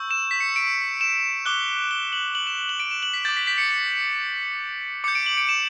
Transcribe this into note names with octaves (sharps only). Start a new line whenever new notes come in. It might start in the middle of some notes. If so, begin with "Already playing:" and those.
Already playing: C#6 E6 G6
E7
B6
C#7
D7
E7
D6 F#6 G7
G7
F#7
F#7
E7
F#7
D7
E7
F#7
B6
D6 G6 A6
B6
B6
C#7
C#7
D6 G6 C#7
D7
F#7
D7
E7